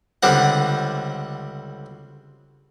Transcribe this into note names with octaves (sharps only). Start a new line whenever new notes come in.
C#2 D3 G3 C4 F#5